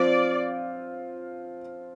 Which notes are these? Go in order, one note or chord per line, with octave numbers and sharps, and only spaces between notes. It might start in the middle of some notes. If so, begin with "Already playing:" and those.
Already playing: F3 C4 F4 D5